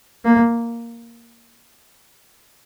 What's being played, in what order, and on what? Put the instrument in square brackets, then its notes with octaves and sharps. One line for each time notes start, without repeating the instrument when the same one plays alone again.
[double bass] A#3